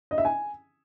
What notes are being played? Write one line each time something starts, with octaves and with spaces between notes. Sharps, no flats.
D#5
E5
G#5